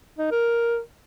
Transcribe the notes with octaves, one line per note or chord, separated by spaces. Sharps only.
D#4
A#4